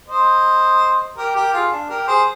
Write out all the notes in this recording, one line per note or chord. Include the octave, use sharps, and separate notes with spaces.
C5 D#5
G4 A#4
G4 A#4
F4 G#4
D4
G4 A#4
G#4 C5